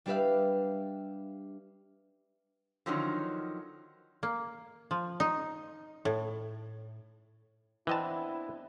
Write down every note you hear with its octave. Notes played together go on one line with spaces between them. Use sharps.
G3 D4 G4 B4 E5 F5
D3 D#3 F3 F#3 C#4 D#4
A#3
F3
D#4
A2
E3 B3 C4 D4 E4 D#5 A5